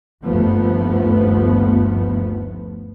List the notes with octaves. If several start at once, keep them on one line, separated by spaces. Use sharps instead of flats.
G1 D#2 F3 A3 B3